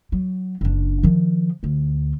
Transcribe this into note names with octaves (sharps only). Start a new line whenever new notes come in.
F#3
F#1 D4
D#3 F3
D2 F4